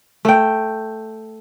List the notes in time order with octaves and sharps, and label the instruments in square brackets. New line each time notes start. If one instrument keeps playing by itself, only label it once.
[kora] A3 G5